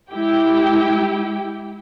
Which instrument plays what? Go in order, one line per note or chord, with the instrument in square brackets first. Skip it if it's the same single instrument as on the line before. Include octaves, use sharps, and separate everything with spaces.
[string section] G#3 E4 G4 G5